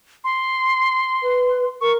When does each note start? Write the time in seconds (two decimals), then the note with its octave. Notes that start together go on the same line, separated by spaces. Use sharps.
0.24 C6
1.22 B4
1.81 A#4 C#6